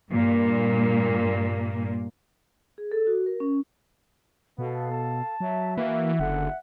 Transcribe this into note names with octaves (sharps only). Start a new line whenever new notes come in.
G2 A#2 A#3
G#4
A4
F#4
A#4
C#4
B2 B3 A4 F5
A5
F#3 E5
E3 A#3 F#4
F#1 D3 F#5